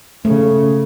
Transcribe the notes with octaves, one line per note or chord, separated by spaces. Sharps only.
C#3 A3